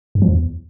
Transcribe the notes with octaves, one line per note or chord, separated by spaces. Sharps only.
G2
F3
E2